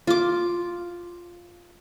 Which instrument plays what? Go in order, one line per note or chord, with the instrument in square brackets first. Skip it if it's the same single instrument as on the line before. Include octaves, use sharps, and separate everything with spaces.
[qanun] F4 D6